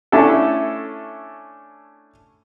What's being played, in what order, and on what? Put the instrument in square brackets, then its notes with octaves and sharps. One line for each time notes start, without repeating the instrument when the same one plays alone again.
[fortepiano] A3 C#4 D4 E4 A4